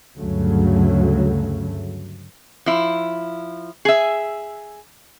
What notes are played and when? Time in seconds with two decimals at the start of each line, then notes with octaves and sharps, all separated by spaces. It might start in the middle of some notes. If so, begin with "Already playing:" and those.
0.18 D2 G2 C#3 F#3 A3
2.66 F3 E4
3.85 G#4 E5